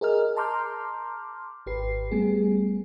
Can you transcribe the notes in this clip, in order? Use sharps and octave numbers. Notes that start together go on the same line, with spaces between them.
G#4 A#4 D#5 F6
A5 A#5 C6 D6 F6 G6
G#1 G4 B4 C7
G3 A3 B3 G#4